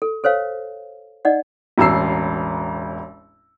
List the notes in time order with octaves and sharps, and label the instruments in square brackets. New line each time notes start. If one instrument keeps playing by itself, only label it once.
[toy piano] A4
A4 C5 C#5 F5
D#4 D5 D#5 F#5
[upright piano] E1 A1 A#5 E6 C7